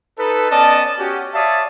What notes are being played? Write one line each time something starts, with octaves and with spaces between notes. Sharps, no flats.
D#4 A4 B4
B3 C#4 D5 D#5 A5
C#4 F#4 G4
C#5 D5 E5 F5 A5 D#6